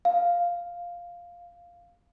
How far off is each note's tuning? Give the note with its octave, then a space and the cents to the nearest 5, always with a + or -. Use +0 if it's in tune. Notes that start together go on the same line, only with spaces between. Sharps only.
F5 +0